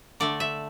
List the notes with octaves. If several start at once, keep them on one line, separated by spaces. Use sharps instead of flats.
D3 A3 D5
E5